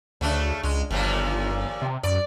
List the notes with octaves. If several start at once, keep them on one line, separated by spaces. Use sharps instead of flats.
D2 C#3 A3 D4
C#2 G#3
G1 D#2 A#2 F3
C3
F#2 D5